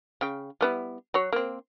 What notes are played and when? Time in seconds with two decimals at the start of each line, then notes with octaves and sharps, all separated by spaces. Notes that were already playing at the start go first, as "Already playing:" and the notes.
0.21 C#3 G5
0.61 G3 B3 E4
1.14 F#3 F#4 C#5
1.32 A#3 C4